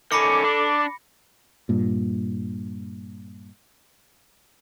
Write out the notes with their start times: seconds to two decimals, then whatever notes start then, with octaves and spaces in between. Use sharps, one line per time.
0.12 D#3 C#4 A4 B5 D6 A#6 C#7
0.44 D4
1.69 G2 A#2